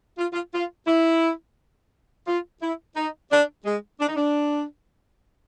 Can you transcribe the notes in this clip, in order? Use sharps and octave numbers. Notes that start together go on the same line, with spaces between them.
F4
F4
F4
E4
F4
E4
D#4
D4
G#3
D4
D#4
D4